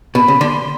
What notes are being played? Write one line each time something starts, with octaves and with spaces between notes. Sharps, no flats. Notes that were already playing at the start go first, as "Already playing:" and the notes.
B2 B5
C#3
D3 C6